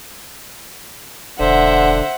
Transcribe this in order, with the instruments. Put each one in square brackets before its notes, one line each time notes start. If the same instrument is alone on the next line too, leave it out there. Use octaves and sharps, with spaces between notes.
[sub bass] E1 [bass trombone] D3 [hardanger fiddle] C5 E5 [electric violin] F#5